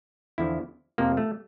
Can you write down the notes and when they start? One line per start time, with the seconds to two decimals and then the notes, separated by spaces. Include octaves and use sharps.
0.38 E2 D3 F3 E4
0.98 F2 C3 F3 A#3
1.17 A3